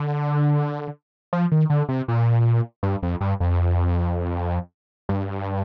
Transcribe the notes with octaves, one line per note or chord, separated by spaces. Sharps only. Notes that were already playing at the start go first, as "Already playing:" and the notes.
Already playing: D3
F3
D#3
D3
C3
A#2
G2
F2
G2
F2
G2